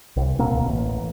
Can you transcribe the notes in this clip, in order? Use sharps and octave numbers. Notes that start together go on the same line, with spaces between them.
C2
D1 B2 A#3 C4
A1